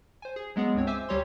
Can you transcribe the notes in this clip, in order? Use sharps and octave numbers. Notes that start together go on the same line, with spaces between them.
C5 G#5
G#4
F#3 G#3 B3 G#4
C#2 G2 C4 C#5
C5 E5 G#5 D6 E6
D2 G3 G4 C#5 A#5 C6